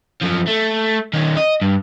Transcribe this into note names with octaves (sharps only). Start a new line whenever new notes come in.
F#2 F3
A3
D#3 C#4
D#5
G2